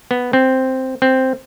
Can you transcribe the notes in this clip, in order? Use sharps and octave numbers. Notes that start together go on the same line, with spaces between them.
B3
C4
C4